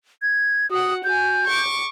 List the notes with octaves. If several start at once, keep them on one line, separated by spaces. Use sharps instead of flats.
G#6
F#4 F#5 D#6
F#4 G#5 G6
C#6 D6